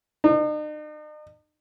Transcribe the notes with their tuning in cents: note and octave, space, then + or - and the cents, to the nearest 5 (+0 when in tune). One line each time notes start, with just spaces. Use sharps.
D#4 -45